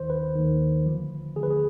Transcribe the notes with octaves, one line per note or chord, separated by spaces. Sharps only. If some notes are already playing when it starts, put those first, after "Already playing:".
Already playing: D#2 D#3 C5
B4
D#2 D#3
D2 D3 F3
D2 D3 F3 G#4
B4
G#4